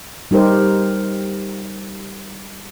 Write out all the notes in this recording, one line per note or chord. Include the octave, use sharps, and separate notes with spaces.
G3 D#4 G4 A#4 C5